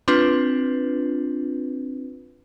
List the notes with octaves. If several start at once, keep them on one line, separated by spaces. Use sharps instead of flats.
C4 D4 F4 B4